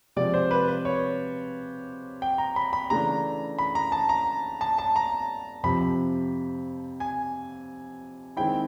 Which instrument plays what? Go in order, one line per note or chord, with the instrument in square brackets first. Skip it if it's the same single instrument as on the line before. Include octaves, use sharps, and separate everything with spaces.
[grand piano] C3 F3 G#3 D5
C5
B4
B4
C#5
G5
A#5
B5
B5
C#3 E3 A3 D4 A#5
B5
A#5
A5
A#5
A5
A5
A#5
F2 C3 F3 B5
G#5
D#3 G#3 C4 E4 G5